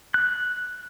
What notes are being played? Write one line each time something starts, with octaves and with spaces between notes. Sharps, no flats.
F#6